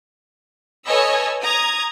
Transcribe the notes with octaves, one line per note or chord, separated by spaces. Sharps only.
A4 B4 C#5 D#5 G#5 E6
A#5 D#6 G#6